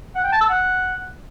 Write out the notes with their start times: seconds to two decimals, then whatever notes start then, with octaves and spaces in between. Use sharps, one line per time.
0.15 F#5
0.24 G5
0.32 A5
0.41 E6
0.49 F#5